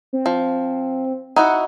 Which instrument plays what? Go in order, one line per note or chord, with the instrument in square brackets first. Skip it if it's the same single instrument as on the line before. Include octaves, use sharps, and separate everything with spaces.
[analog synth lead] C4
[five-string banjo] F3
[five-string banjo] D#4 E4 F#4 [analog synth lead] F#5